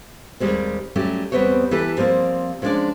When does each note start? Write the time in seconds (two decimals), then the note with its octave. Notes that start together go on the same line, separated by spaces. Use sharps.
0.40 D#2 G#2 G3 G#3 C4
0.96 F#3 G3 A3 C#4 G4
1.32 E2 G3 B3 C4 C5 C#5
1.71 E3 G4 A4 B4
1.97 F3 G3 A#3 C4
2.62 F3 G#3 C#4 D4 C#5 D5